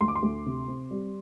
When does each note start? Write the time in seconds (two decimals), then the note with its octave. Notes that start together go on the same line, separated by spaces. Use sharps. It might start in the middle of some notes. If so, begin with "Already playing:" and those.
0.01 D2 C6
0.08 D6
0.15 C6
0.23 D2
0.46 C3
0.68 C4
0.91 G3